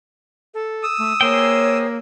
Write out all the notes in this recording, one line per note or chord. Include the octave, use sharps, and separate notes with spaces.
A4
D#6 E6
A3
A#3 G#4 C5 C#5 G5